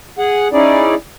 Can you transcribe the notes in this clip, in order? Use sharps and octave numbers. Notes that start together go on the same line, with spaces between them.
G#4 F#5
C#4 D#4 E4 G#4 D5